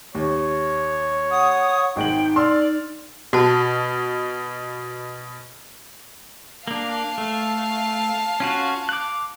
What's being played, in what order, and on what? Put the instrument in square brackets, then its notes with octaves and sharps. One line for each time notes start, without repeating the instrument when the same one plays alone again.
[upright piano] D#2 [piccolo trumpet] C#5
[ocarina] F#5 [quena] D#6
[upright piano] G#1 G#3 F#7 [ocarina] D#4 [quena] G5
[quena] D5 [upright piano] C6 E6 F6
[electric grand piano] B2 [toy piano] F#4 A5
[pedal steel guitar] A#3 D4 [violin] F5 A5
[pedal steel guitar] A3
C#4 F4 F#4
D6 F#6